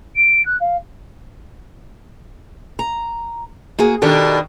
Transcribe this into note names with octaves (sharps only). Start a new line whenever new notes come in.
D7
F#6
F5
A#5
A#3 F#4 G#4
B2 D#3 D4 G4 A4